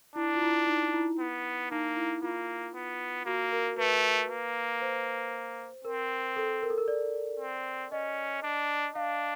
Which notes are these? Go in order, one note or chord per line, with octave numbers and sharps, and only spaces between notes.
D4 E4
F4
E4
D#4
E4
B3
A#3 D#4
E4
A#3 F4
B3
A#3 F#4
A#4
A3 B4
A#3
C5
C4 A#4
A4
A#4
A4
A#4
D5
C4
C#4 D#5
D4
D4 F5